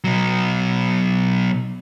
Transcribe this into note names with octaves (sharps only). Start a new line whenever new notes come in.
B2 F#3